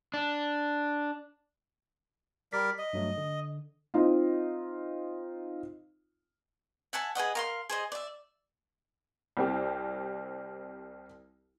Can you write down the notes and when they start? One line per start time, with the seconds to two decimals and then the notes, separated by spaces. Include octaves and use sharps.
0.14 D4
2.53 G3 A#4 D5 B6
2.78 D#5
2.93 G2 F#3 A3
3.17 D3
3.94 C4 D#4 F4
6.93 E5 F#5 G#5 A5
7.15 G#4 B4 D#5 F#5
7.35 A#4 F5 C6
7.69 G#4 C5 D#5
7.92 D5 E5
9.37 C2 C4 G4